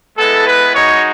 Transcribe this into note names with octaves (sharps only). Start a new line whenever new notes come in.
G#3 B3 E4 A4
B4
G#3 D#4 F#4 C#5